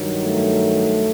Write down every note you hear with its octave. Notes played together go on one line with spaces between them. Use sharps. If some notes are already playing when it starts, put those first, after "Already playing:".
Already playing: G2 D#3 F#3
A3